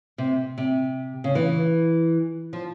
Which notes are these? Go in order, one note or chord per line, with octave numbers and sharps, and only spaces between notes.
C3
C3
C#3
E3
F3